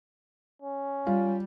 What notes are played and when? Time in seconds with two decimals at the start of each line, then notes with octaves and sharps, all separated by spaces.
0.62 C#4
1.07 G3 F4